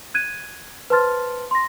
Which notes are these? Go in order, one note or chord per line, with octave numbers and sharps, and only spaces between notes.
F#6 G#6 D#7
B4 C5 A5 C6 F6 A6
C6 A#6